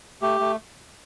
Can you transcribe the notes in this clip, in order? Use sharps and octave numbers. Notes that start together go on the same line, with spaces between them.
A3 G4
A3